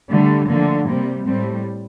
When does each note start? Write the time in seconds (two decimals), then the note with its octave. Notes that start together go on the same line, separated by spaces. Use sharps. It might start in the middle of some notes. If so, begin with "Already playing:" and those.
0.10 D3 G3 A3
0.49 D3 F3 A3 A#3
0.87 C3 G3 A#3
1.26 A2 G3 A3 C4